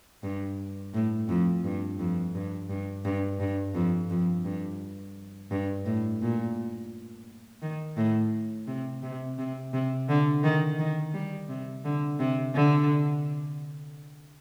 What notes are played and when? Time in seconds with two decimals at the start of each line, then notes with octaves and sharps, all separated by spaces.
0.23 G2
0.94 A2
1.29 F2
1.64 G2
1.99 F2
2.35 G2
2.69 G2
3.05 G2
3.40 G2
3.75 F2
4.10 F2
4.45 G2
5.51 G2
5.86 A2
6.22 A#2
7.62 D#3
7.97 A2
8.67 C3
9.03 C3
9.38 C3
9.73 C3
10.09 D3
10.44 D#3
10.78 D#3
11.14 G3
11.49 C3
11.85 D3
12.19 C3
12.55 D3